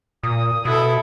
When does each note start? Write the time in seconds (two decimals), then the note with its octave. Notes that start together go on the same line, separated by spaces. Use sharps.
0.23 A#2 D#6
0.65 B2 E4 A4